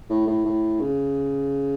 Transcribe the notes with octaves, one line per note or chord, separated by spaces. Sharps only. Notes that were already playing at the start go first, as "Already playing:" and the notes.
A2
A2
A2
C#3